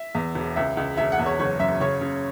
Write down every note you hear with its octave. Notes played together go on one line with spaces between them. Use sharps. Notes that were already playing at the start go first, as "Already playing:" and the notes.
Already playing: E5
E2
E1
C#2 E5
C#2
E1 E5
F#5
E2
C#5
F#1 C#5
F#2 E5
C#3 C#5
C#3